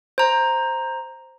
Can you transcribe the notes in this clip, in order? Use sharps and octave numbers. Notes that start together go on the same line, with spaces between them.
C5 A#5